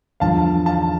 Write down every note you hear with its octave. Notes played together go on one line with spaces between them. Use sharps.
E2 D3 F3 F5 A5
F5 A5